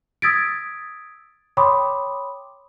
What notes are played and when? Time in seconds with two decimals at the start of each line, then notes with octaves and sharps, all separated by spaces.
0.22 D#6 E6 G#6 A6 B6 D7
1.57 C#5 G5 B5 C6 D6 D#6